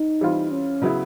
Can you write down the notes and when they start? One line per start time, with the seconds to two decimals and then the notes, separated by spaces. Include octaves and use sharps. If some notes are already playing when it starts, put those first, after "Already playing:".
Already playing: D#4
0.21 E3 G3 C4 F4
0.51 C#4
0.82 C#3 F#3 B3 E4